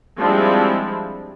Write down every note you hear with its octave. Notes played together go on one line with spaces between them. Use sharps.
F3 G3 G#3 C4 D4 E4